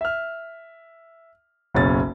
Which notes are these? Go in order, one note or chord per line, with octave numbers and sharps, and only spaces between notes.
E5 F6
F#1 B1 C#3 C#4 A6